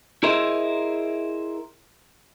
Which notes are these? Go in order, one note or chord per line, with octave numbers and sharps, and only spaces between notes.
E4 G#4 A#4 C5 D#5 E5